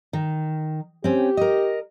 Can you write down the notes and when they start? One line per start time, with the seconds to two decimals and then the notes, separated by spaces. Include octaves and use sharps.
0.13 D#3
1.04 C4 C#4 G4
1.37 A#4 D#5